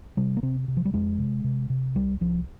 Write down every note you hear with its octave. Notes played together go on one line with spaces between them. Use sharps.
C3 G3
A#3
C3 C4
C3
F3
G3
F2 G#3
C3
C3
C3
C2 G3
C2 F3